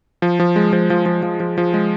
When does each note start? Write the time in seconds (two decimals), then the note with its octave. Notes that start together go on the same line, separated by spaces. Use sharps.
0.22 F3
0.40 F3
0.56 G#3
0.73 F3
0.90 F3
1.06 F3
1.23 F3
1.40 F3
1.58 F3
1.74 G#3